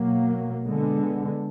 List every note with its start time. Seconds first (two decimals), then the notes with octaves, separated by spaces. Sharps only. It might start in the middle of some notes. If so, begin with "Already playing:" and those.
Already playing: B2 F#3 A#3
0.66 D3 G#3 B3